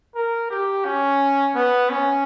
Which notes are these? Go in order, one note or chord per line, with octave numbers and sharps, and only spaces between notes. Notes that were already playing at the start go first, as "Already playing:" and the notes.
A#4
G4
C#4
B3
C#4